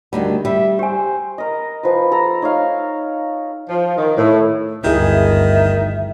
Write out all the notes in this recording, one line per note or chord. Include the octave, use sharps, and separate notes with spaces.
D2 D#3 G3 D4
G3 E5
G4 C5 G#5
A#4 D#5
F3 B4
A4 A#5
D#4 C#5 D#5 F5
F3
D#3
A2
G1 D2 D#3 E4 G#4 E5